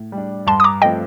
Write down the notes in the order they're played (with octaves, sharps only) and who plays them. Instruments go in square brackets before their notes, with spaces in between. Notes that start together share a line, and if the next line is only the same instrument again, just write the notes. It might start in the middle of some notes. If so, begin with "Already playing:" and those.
Already playing: [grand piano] A2
G3
D4
[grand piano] G2 [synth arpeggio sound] A5 C6
[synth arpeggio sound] D#6
A#5 D6
[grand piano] F3 A3 C4 [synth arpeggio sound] D#5 G5